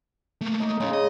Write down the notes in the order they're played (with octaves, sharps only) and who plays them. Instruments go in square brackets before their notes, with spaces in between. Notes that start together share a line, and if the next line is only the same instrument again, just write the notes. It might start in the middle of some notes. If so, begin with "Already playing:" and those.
[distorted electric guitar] A3 A#3
[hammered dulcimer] D#4
[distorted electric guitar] A2 C#4 [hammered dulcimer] C#3 G#3
[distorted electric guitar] D#5